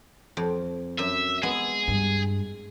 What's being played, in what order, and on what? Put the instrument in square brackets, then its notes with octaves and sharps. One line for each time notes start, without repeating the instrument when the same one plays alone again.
[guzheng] F2
[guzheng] F#2 [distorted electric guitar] E5
[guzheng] G#3 B3 [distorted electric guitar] G#4
[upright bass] G2